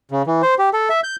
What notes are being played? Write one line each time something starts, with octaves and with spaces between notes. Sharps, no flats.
C#3
E3
C5
G4
A4
E5
G6